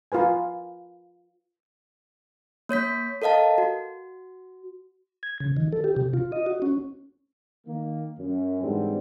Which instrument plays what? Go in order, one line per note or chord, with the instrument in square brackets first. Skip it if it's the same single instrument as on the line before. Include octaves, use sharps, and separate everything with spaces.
[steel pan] F4 A#4 B4 G#5
[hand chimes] A#3 C#5 G6 B6
A4 A#4 D#5 F5 A5
F#4
[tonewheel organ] G#6
C#3
D#3
A4
G4
C3
F4
D#5
F#4
C#4
[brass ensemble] D#3 A#3
F#2
G#2 D3 E3 G3 C4